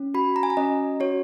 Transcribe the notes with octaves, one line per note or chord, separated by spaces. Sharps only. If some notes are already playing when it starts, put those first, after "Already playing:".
Already playing: C#4
F#4 B5
A#5
G#5
A#5
C#4 D#5
F#4 C#5